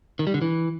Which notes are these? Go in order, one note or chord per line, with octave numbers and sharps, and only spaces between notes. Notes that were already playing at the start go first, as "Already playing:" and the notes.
D#3
G3
D3
E3